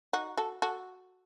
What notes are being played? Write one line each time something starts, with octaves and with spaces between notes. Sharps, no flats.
D#4 F#4
F#4 A4
F#4 A4